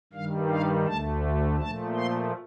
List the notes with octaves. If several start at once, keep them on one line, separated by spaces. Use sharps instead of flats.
G2 D#3 G3 F5
F5
D2 D3 A3 A5
A#2 F3 A3 A5
C6